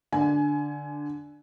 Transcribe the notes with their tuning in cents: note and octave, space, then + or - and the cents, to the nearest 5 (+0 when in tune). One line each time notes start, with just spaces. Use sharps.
D3 +0 G#5 +20